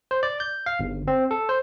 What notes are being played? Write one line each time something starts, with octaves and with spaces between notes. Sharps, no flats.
C5
D5
G6
F5
G1
C4
A4
C5